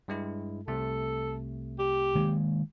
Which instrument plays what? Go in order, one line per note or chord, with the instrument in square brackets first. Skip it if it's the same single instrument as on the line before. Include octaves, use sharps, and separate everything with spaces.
[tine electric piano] G2 G#3 E4
[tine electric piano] C2 C3 A3 [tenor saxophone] A4
[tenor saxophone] G4
[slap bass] D#3 G#3 A#3